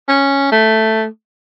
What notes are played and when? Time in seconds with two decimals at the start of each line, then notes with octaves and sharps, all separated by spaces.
0.08 C#4
0.52 A3